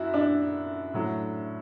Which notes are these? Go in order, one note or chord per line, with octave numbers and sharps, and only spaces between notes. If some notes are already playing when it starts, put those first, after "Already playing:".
Already playing: F#2 E4 F#4
D4
A2 F#3